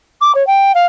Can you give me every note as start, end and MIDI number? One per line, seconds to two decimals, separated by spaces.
0.21 0.32 86
0.34 0.45 73
0.47 0.72 79
0.74 0.86 77